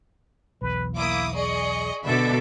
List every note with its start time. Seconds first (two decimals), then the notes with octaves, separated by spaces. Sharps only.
0.62 B1 E2 B4
0.95 A#3 E4 D6 D#6
1.34 G#4 D5 D#5 C#6
2.05 B2 D3 A4 E5 B5 D6